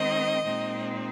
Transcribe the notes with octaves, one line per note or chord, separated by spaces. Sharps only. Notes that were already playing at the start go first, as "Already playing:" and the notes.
Already playing: D#3 G#3 C4 D#4 D#5
A#2 G#3 C4 D#4